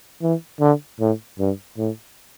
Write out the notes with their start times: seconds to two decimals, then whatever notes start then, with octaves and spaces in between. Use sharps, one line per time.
0.22 E3
0.60 D3
1.00 A2
1.39 G2
1.78 A2